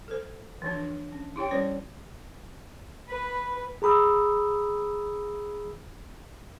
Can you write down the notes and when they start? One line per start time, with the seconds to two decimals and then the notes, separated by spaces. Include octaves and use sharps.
0.08 A4 C5
0.62 E3 F3 D4
1.12 C#4
1.36 E4 G4 C#5 G5
1.51 G3 C#4 C5 C#5
3.09 B4
3.82 G#4 A#5 B5 D#6 E6